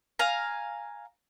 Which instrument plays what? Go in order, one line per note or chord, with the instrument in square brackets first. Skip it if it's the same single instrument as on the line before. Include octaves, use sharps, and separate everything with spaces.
[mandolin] F5 G#5 A#5